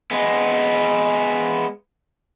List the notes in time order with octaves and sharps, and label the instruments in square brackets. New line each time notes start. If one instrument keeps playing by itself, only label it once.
[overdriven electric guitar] G#3 B3